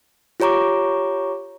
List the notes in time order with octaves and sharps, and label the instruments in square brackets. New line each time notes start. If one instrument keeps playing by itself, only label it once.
[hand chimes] F4 G4 C#5 A#5 C#6 D6